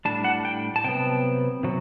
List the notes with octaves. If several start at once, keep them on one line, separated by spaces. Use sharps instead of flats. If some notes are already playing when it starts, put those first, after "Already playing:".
A2 G3 D4 A5
F#5
G5
A5
C3 F#3 B3 G5
C3 F#3